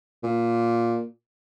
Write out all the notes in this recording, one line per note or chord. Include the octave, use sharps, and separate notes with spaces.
A#2